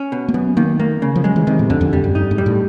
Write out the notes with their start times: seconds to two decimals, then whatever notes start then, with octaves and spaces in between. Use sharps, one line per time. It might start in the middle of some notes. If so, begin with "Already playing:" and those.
Already playing: C#4
0.12 B2
0.28 A#3
0.34 F#2 B3
0.57 D#3 A#3
0.80 A3 A#3
1.02 C#3
1.16 F3
1.24 F#3 G#3
1.36 E3
1.47 C3 D#3
1.59 A2
1.70 F2 D3
1.81 F2
1.93 F2 G3
2.04 F#2
2.15 G2 D#4
2.31 G#2
2.38 G3
2.46 A2